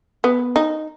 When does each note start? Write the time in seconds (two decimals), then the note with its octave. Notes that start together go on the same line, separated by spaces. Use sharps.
0.24 B3
0.56 D#4